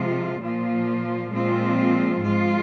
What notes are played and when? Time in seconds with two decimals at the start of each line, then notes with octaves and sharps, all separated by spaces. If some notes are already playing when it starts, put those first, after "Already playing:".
Already playing: C3 F3 G#3 F4
0.41 A#2 F3 A#3 F4
1.32 A#2 F3 G#3 C4 F4
2.23 G#2 F3 G#3 F4